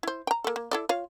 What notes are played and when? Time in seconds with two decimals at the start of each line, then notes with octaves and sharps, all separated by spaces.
0.03 E4 C5
0.27 G5 A#5
0.44 A#3 A4
0.56 A#3
0.71 E4 A4 D5
0.89 F4 C#5 F5